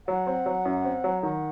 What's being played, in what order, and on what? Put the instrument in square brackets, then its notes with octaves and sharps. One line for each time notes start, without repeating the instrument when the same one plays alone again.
[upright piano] F#3 [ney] F#5
[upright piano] C4
F#3
F#2
C4
F#3
[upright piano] D#3 [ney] F#5